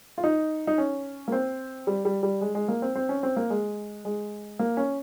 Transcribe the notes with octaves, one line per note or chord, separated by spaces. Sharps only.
F4
D#4
D#4
C#4
A#3
C4
G3
G3
G3
G#3
G#3
A#3
C4
C4
C#4
C4
A#3
G#3
G#3
A#3
C#4